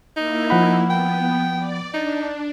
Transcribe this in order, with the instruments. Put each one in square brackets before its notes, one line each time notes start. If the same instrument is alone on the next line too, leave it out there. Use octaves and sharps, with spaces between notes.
[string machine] A#3 E4 [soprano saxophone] D#4
[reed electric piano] F3 F#5 B5
[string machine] B3 [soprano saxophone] G5
[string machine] D5
[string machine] D4 [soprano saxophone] D#4